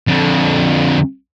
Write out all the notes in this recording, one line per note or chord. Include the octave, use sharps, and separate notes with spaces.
F2 D3